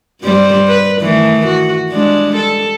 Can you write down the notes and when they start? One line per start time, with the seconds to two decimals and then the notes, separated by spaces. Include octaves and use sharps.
0.21 G2 G3 C5
0.68 B4
1.01 D#3 E3 A3
1.47 F#4
1.89 G3 G#3 D4
2.37 A4